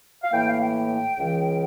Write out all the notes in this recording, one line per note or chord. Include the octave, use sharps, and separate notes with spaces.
F5
A2 E3 A#3 G5
F5
G5
C#2 C#3 E3